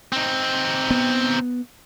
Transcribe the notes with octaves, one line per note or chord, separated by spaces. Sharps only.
C4 D#4
B3